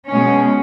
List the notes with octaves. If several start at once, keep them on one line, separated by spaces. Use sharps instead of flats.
B2 G#3 C#4